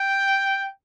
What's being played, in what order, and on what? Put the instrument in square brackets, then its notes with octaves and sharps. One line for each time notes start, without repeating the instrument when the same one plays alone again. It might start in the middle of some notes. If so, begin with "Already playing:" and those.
Already playing: [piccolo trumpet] G5